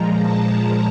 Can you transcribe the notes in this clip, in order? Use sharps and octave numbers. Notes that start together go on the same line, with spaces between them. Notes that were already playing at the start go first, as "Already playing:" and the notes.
Already playing: A#2 F3 G#3 A#5
A5